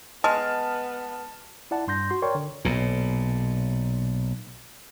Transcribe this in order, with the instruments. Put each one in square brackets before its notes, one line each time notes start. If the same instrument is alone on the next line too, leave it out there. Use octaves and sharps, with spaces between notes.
[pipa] G#3 [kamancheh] B3 [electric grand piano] A5 F6
[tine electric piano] E4 D5 F#5 A5
G2 C6 G6 A#6
F#4 C6
A#4 C#5 D5 G5 C6 C#6
D3
[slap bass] B1 A#2